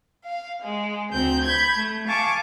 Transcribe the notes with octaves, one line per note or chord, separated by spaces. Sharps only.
F5
G#3
D2 C4 G6
B5 G6 G#6
A3
F5 G#5 A5 C#6 D6